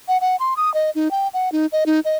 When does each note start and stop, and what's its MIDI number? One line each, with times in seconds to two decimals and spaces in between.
0.08 0.18 78
0.21 0.36 78
0.40 0.54 84
0.57 0.73 87
0.74 0.90 75
0.95 1.11 63
1.11 1.28 79
1.34 1.49 78
1.52 1.66 63
1.72 1.84 75
1.86 2.00 63
2.05 2.17 75